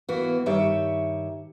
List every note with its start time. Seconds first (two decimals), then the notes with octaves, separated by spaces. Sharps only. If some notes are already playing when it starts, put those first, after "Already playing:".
0.09 E3 A#3 B3 F#4
0.46 G2 D#3 G4 C#5 E5